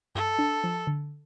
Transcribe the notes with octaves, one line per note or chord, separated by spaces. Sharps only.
G2 A4
D4
F3
D3